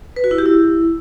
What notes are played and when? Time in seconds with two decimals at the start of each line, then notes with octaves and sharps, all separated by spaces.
0.16 B4
0.24 F#4
0.31 E4
0.38 G4
0.46 E4